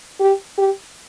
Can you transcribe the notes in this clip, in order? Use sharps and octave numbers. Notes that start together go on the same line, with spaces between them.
G4
G4